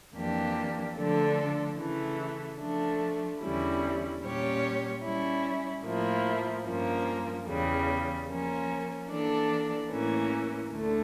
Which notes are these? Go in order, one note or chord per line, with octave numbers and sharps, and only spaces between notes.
F2 E3 A#3 D4 G4
D3 F3 A3 D4 A4
C#3 E3 A3
F3 A3 D4
E2 D3 G3 C#4 E4
A#2 G3 C#4 G4 C#5
G3 C#4 E4
A2 F3 A#3 E4
G2 F3 A#3 C#4
E2 C#3 G3
F3 A#3 C#4
E3 A#3 D4 A4 D5
A2 E3 A#3 C#4
D2 D3 A3